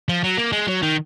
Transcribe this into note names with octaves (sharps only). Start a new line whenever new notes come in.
F3
F#3
A#3
G#3
F#3
D#3